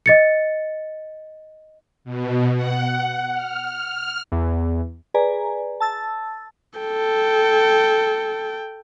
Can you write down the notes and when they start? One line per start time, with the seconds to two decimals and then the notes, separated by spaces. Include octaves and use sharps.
0.06 D#5 A6 C#7
2.04 B2
2.55 F#5
3.33 F6
4.32 E2
5.14 G#4 B4 D5 G#5 A#5
5.80 A5 E6 A6
6.79 A4 G5